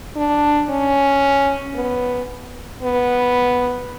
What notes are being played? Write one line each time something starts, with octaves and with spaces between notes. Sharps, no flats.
D4
C#4
B3
B3